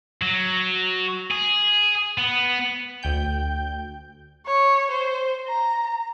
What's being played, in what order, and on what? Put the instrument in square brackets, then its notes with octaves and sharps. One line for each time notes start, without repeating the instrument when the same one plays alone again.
[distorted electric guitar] F#3
G#4
B3
[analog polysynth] D2 G5 G6
[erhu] C#5
C5
A#5